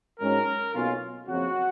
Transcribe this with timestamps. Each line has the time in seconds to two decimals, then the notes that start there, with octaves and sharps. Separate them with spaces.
0.20 G#2 F#3 C#4 A#4
0.74 B1 B2 A#3 C#4 F4
1.27 F#1 F2 C#3 F#3 F#4